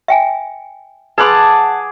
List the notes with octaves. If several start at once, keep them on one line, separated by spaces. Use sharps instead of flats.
E5 G5 G#5
G#4 B4 F#5 A5 B5 C6 D6